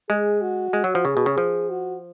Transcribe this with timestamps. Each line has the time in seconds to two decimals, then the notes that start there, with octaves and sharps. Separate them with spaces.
0.09 G#3 G#4
0.42 F#4
0.73 G#3
0.84 F#3
0.95 F3
1.05 C#3 G#4
1.17 B2
1.26 C#3
1.38 F3
1.70 F#4